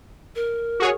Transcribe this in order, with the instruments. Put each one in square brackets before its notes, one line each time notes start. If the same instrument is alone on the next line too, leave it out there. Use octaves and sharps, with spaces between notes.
[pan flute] A#4
[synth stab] F#4 G#4 C#5